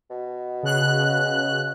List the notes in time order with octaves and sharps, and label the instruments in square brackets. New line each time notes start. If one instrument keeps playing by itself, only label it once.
[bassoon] B2
[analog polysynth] C#3 F#6